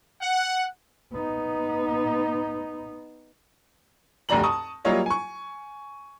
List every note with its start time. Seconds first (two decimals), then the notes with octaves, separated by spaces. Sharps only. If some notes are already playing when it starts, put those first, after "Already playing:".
0.21 F#5
1.12 B3 D#4
4.29 F1 D2 G2 D5 A#5 F#7
4.43 A5 C#6 D#6
4.85 F#3 G3 A#3 F4 C#5 D#5
5.06 G#5 C#6